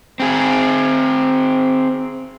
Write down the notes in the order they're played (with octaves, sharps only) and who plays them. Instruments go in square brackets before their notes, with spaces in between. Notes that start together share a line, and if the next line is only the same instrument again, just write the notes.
[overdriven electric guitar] C4 G#4